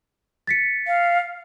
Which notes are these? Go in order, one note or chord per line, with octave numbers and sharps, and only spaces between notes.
A6 B6 C#7
F5